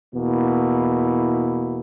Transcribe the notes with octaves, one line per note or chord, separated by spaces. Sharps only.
E2 B2 A#3 E4